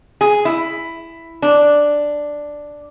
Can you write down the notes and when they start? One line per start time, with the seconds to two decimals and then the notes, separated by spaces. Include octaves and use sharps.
0.21 G#4
0.45 E4
1.42 D4